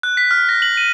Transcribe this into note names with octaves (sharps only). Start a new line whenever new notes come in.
F#6
B6
F6
A#6
F#7
D#7